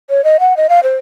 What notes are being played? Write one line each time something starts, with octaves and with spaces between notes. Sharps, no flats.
C#5
D#5
F#5
D#5
F5
C5